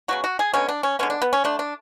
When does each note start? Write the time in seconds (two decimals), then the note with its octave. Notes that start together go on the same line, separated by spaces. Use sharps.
0.08 C#3 F#3 B3 F#4
0.24 F#4
0.39 G#4
0.54 D3 G#3 B3 C#4
0.69 D4
0.83 C#4
0.99 D3 G#3 B3 C#4
1.10 D4
1.22 B3
1.33 C#4
1.44 D3 A3 D4
1.59 D4